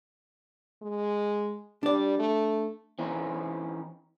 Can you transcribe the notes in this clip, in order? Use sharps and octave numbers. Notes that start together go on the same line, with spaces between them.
G#3
G3 D4 D5
A3
E3 C4 C#4 D#4